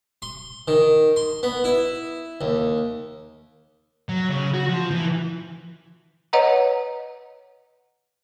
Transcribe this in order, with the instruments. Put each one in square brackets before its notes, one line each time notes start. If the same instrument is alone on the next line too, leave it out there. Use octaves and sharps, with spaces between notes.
[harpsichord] C6
D#3
C6
B3
E4
D#2
[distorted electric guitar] F#3
C#3
F#4
F3
E3
[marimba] B4 C#5 D#5 F#5 A#5